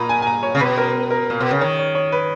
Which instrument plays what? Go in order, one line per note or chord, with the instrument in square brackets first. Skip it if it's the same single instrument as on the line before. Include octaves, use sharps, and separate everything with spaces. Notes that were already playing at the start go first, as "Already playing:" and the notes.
Already playing: [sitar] A#2 [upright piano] A#5 B5
[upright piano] G#5
G#5
A#5
C#5
[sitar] C#3
[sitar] B2 [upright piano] B4
[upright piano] A#4
A#4
[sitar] A#2
B2
C#3
[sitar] D#3 [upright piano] C#5
[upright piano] C#5
C#5
B4